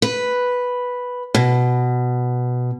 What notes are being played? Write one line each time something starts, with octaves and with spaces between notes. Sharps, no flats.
B4
B2